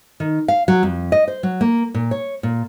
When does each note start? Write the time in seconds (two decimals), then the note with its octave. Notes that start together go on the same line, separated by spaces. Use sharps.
0.20 D#3
0.48 F5
0.68 F#3
0.83 F2
1.12 D#5
1.28 C5
1.43 F#3
1.61 A#3
1.94 A#2
2.11 C#5
2.43 A#2